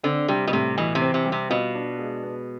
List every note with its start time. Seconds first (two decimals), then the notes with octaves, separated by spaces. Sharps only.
0.03 D3 C4
0.28 C3 G3
0.47 B2
0.52 A2 C3
0.77 B2 E3
0.95 C3
1.01 C4
1.14 C3
1.26 G3
1.32 C3
1.50 B2 F4
1.75 D4
1.98 G#3
2.23 B3